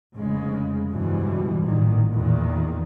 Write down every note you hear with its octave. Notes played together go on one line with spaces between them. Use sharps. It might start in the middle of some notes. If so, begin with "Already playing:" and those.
F1 C#3 G#3
C#2 G2 B2 E3 F3 G3
A1 A#2 D#3
E2 A#2 D#3